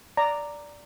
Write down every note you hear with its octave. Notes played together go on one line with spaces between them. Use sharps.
D5 A#5